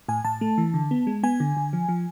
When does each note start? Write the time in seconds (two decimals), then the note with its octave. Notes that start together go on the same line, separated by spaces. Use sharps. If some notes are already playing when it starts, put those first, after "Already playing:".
0.08 A2 G#5
0.25 A2 A5
0.41 A3
0.58 E3
0.74 D3
0.91 B3
1.07 G#3
1.23 B3 G#5
1.40 D3
1.57 D3
1.73 F3
1.89 F3